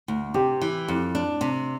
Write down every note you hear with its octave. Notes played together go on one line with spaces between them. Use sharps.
D2
C3 G4
E3
F2
D4
C3